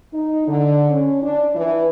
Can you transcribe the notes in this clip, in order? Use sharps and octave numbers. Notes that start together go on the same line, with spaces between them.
D#4
D3
C#4
D4
E3